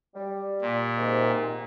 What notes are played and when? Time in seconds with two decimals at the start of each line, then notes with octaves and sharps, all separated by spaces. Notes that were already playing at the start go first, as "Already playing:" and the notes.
0.14 G3
0.62 A#2
0.97 G#2 C3 D#3